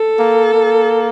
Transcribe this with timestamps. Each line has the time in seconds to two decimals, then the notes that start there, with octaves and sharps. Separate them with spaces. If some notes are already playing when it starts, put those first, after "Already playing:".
Already playing: A4
0.18 A#3
0.54 A#3